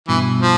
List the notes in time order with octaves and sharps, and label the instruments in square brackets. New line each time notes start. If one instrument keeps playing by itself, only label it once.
[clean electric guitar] G2 B2 [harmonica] E3
[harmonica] F3